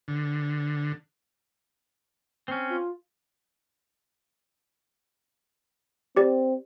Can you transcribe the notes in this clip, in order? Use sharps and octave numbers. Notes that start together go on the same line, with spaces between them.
D3
C4 C#4
F4
C4 G4 D5